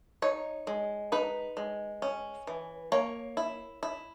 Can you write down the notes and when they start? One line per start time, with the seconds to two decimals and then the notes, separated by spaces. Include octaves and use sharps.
0.22 D#4 C#5
0.67 G#3
1.12 D#4 B4
1.57 G#3
2.02 C#4
2.47 E3
2.92 A#3 C#5
3.37 E4
3.83 E4